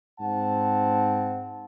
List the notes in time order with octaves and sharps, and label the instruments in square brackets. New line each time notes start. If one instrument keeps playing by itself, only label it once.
[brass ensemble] G#2 C4 F#5 A5